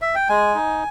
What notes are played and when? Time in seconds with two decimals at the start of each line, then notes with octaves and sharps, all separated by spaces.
0.02 E5
0.15 G5
0.29 G#3 G#5
0.55 D#4